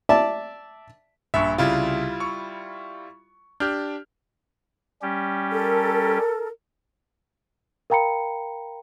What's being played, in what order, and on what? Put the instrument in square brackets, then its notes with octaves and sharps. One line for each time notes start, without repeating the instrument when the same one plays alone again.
[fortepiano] D5 E5 A5
[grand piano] A#1 G2 C#6 [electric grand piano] E5
[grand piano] C2 C#3 [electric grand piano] G3 E4 F4
[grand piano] C#6
[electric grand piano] D4 G4 [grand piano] F6 G6
[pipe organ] G3 C#4 G4
[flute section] A4 A#4
[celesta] A#4 F5 G5 A#5 B5 C#7